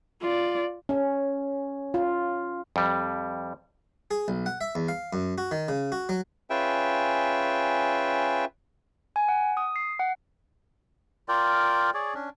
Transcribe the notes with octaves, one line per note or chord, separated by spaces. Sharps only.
F4 D5
C#4
F4
F2 G3
G#4
B1
F#5
E5
E2
F5
F#2
F#4
D#3
C#3
F#4
F#3
C#4 F4 G#4 B4 E5 G5
G#5
F#5
D#6
C7
F#5
F4 A#4 D5 G5
G#4 C#5 D5
C#4 D4